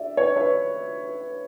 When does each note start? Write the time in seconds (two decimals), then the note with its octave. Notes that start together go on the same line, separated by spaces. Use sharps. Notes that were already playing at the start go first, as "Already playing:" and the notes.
Already playing: D5 E5
0.17 B4 C#5
0.36 B4 C#5